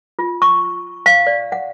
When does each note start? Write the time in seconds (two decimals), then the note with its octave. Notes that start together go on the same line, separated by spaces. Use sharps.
0.19 F4
0.42 C#6
1.06 F5
1.27 D5
1.52 F#5